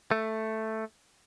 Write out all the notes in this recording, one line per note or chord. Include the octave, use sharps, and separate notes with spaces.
A3